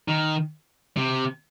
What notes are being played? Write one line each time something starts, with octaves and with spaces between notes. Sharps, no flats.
D#3
C3